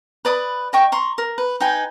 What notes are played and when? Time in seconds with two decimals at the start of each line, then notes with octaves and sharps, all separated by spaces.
0.25 B4 D5 B5 D#6
0.73 D#5 G5 C#6
0.92 A#5 C6 C#6
1.18 A#4
1.38 B4
1.60 D#4 B4 G5 G#5